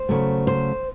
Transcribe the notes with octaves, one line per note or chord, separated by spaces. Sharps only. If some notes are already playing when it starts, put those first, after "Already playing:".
Already playing: C5
C#3 F#3 A3
C5